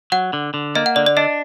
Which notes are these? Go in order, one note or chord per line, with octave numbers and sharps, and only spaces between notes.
F#3 F#5
D3
D3
A#3 D#5
F#5
D3 D5
D5
D4 D#5